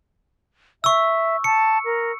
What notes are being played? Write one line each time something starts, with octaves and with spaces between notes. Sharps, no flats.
E5 C#6 E6
A5 C#7
A#4